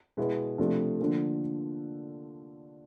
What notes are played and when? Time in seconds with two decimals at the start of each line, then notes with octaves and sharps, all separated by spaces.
0.17 B2 G#3 B3 E4
0.58 C3 F3 A3 D4
0.99 D3 F3 A#3